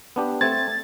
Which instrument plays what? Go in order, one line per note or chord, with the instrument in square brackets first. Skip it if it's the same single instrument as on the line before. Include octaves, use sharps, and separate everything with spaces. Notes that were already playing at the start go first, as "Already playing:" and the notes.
[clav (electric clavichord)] B3 D4 G4
[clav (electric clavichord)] A3 C4 [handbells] G#6 [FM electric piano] A6